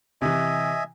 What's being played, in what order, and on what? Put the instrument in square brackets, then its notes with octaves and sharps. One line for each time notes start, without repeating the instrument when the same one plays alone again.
[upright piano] C3 E3 [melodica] D#5 E5 G#5